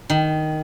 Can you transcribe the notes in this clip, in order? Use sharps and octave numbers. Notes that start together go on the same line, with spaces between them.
D#3